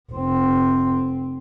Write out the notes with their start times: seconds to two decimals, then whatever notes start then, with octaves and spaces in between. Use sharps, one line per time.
0.12 F1 C4